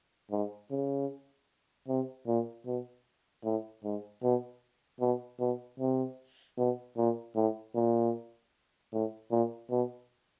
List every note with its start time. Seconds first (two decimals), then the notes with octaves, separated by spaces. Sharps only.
0.31 G#2
0.71 C#3
1.88 C3
2.27 A#2
2.66 B2
3.44 A2
3.84 G#2
4.23 B2
5.01 B2
5.40 B2
5.80 C3
6.58 B2
6.97 A#2
7.35 A2
7.75 A#2
8.92 A2
9.31 A#2
9.70 B2